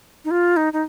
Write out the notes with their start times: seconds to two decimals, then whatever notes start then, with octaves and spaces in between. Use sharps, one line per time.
0.25 D#4
0.31 F4
0.57 D#4
0.73 D#4